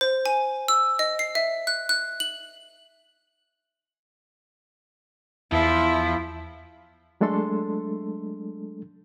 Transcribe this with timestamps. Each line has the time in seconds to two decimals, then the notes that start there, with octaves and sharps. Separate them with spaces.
0.01 C5
0.26 G#5
0.68 E6
0.99 D#5
1.19 C7
1.35 E5
1.67 F#6
1.89 F#6
2.20 F#7
5.52 E2 F3 E4
7.21 F#3 G#3 A3 D4 A4 C6